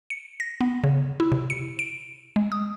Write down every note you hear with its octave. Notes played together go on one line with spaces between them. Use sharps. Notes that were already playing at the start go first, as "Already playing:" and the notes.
C#7
A#6
B3
C#3
E4
C3
C#7
D7
G#3
D#6